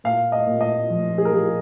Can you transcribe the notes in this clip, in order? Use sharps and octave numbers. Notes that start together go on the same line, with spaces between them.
A#2 F5
D#5
A#2
D#5
F3
G#4
A#4
F3 G#4